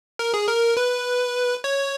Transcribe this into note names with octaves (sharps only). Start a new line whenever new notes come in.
A#4
G#4
A#4
B4
C#5